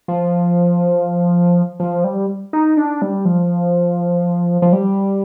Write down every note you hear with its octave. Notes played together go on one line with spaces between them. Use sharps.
F3
F3
G3
D#4
D4
G3
F3
F3
G3